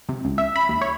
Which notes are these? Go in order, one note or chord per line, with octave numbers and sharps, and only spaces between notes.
C3
C#2
E5
B5
D#2
C#5